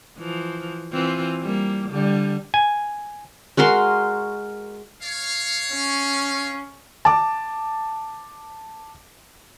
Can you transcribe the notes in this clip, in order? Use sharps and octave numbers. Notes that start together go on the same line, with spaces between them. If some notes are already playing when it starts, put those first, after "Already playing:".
E3 F3
E3 C4 F4
G3 A#3
D3 G3
G#5
G#3 F#4 A#4 C6
C#5 F5
C#4
A5 D6